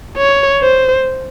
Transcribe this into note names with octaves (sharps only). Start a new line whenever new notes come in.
C#5
C5